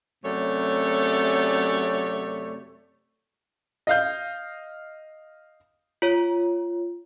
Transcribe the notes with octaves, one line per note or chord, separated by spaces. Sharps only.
F#2 C3 A3 C#5 D5
D#5 F5 G6
F4 C#5